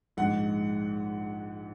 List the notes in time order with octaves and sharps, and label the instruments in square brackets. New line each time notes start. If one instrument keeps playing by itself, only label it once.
[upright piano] A#1 G#2 G#3 F#5